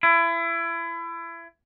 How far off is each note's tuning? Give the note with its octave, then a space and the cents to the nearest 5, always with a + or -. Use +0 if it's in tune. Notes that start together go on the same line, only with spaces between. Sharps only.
E4 +30